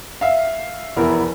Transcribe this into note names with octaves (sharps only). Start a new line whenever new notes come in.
E5 F5
F1 E2 E4 A#4